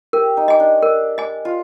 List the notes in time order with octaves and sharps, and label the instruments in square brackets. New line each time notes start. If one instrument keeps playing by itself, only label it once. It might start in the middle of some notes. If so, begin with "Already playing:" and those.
[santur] G4 [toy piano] A#4
[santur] D#4
[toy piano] D#5 G#5
[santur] D4
[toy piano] A#4
D#5 G#5
[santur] F4